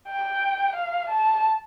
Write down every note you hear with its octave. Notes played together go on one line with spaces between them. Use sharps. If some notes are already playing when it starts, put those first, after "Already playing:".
G5
F5
A5